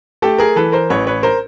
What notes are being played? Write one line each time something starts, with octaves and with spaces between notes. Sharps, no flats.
A3 G4 A4
G#4 A#4
E3 A4 B4
A#4 C5
A1 B4 C#5
B4 C#5
A#4 C5